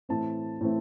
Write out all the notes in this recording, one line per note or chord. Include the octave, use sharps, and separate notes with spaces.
A2 E3 A3 C4 A5
A2 E3 A3 C4